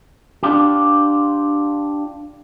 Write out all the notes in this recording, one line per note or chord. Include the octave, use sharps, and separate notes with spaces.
D4 F4 G4